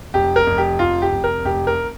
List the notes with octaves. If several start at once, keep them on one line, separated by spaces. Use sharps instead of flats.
F1 G4
A#4
F1
G4
F1 F4
G4
F1
A#4
F1 G4
A#4